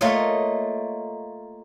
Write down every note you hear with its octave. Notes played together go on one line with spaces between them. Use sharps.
A3 A#3 F4 A#4 C#5 D#5